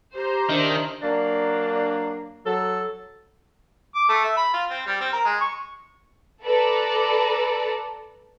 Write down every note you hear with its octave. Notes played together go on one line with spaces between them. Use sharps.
G4 C5 A#5
D#3 D4 D#5 E5
F#3 A#3 D4
F#3 A4
D6
A3
E5
B5
F4
C4
G3
C4
A#4
G#3
C#6
A4 B4 D5 A#5